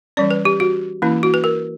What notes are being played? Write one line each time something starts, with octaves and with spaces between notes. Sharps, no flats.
E3 G3 C#4 D5
B4
G4
F#4
E3 A#3 C#4 E4
F#4
B4
A#4